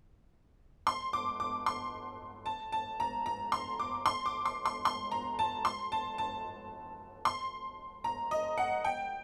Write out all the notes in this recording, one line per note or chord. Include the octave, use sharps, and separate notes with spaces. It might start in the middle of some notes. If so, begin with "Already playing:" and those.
C6
D6
D6
C6
A5
A5
A#5
A#5
C6
D6
C6
D6
C6
C6
C6
A#5
A5
C6
A5
A5
C6
A#5
D#5
F#5
G5